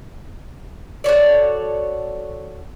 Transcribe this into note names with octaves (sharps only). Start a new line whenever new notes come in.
F#4 A4 C#5 D5